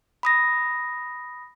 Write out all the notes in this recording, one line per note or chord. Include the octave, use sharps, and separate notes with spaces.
B5 D#6 A#6